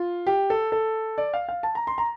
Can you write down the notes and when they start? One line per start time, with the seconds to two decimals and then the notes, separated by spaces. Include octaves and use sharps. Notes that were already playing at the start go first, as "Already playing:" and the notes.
Already playing: F4
0.27 G4
0.50 A4
0.72 A4
1.18 D5
1.34 F5
1.49 F5
1.63 A5
1.75 A#5
1.87 C6
1.98 A#5